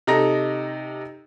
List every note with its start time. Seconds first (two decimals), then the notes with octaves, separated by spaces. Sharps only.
0.07 C3 D#4 A4 A#5 A#6